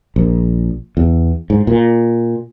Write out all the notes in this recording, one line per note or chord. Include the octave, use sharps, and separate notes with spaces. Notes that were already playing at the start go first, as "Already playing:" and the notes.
A#1
E2
G#2
A#2